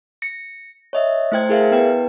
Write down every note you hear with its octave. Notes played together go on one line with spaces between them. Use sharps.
A#6 C#7
C#5 D#5 E5
A3 E4 C5 G5 G#6
E4 G#4 A#4 E5 F5
B3 E4 B4 G5